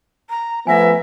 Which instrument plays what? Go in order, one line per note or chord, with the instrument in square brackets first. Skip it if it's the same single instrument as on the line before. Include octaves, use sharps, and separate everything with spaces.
[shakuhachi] A#5
[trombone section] F3 A3 B3 [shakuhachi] E5 [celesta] G#5 A#6